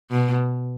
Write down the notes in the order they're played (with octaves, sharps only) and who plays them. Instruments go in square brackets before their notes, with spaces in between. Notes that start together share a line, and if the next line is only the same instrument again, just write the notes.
[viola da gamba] B2